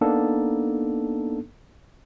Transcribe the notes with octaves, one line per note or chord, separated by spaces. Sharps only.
A#3 B3 D4 D#4 A4